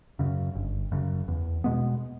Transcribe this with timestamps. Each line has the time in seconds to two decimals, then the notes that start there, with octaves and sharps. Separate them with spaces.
0.19 F#2 C#3
0.55 G1
0.92 F#2 C#3
1.28 E2
1.64 B2 G#3 B3